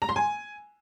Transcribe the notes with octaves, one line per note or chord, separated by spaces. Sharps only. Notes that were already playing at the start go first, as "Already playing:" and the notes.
A#5
C6
G#5